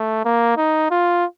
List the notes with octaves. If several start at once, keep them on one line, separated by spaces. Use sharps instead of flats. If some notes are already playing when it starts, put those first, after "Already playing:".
Already playing: A3
A#3
D#4
F4